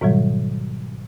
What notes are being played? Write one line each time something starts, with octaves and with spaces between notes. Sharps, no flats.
G#2 B2 D#3 F#3 G3